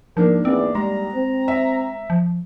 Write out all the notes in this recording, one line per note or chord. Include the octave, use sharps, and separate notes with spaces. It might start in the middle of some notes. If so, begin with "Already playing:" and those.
G#2 F3 A#3 D4 A#4
E2 C4 D5
G3 G#3 A#5
C4
E5
F3